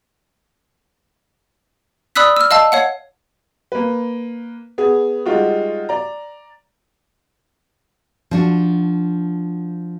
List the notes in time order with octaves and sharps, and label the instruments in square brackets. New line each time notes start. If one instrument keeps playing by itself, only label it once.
[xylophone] D5 B5 D#6 E6 F#6 B6
E6 F6
D#5 F5 A5 E6
C#5 F5 F#5
[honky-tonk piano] A#3 B4
B3 G#4
G3 G#3 D#4 F4 F#4
D5 A#5
[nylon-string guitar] F3 D4 F#4